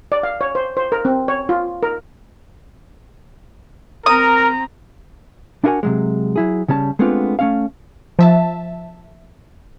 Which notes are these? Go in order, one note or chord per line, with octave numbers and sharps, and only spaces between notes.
D5
F5
C#5
C5
C5
A#4
C4
C#5
F4
A#4
C4 A#4 A#5 D#6
D4 E4 F#4 A#4 F#5 G#5
C3 F#3 G#3
F#3 E4 G#4
C#3 G3 C#4 A5
G#3 A3 B3 C4 D4 F4
A3 C#4 F5
F3 E5 A5